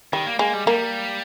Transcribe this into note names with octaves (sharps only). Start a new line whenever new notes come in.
D#3 G3
A#3
G#3 A#3
G3
G3 A#3